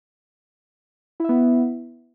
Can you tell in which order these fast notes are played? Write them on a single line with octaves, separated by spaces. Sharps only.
E4 E5 B3